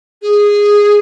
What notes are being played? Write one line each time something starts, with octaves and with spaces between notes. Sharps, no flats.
G#4